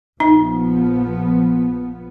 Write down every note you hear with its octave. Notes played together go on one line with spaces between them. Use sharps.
A#1 F3 B3 D#4